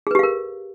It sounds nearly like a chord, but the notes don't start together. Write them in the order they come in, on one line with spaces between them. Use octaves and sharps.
G#4 B4 G4 F5 A#4